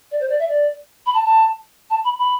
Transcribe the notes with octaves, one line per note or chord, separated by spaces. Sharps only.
D5
C5
D5
E5
D5
B5
A5
A5
A5
B5
B5